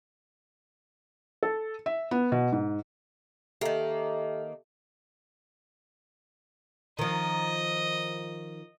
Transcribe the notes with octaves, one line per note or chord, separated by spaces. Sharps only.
A4
E5
B3
B2
G#2
D#3 A#3 G4 A4 E5
D#3 F3 D#5